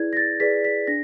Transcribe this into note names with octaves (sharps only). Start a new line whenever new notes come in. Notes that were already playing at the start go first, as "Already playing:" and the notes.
Already playing: E4 G#4 B4 D5 G#6
A#6
A6
G#4 B4 D5 B6
B6
D4 A#6